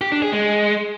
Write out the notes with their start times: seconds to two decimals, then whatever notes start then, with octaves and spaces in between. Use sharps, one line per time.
0.01 G4
0.12 D4
0.22 G#4
0.33 G#3